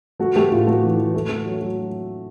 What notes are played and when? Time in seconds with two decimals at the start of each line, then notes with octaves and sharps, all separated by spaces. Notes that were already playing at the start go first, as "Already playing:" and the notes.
0.20 A3 F#4
0.36 A3 G4
0.52 A2 F4
0.67 A3 F#4
0.82 E3
0.98 E3
1.14 A3
1.29 A3
1.45 F#3
1.61 F#3